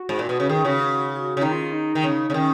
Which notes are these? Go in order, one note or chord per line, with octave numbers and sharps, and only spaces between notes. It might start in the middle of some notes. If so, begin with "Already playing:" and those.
Already playing: F#4
G#2
A#2
B2
C#3
D#3 G#4
C#3 F#4
F#4
C#3
D#3 D#4
F4
F4
D#4
D#3
C#3
C#3
D#3 C#4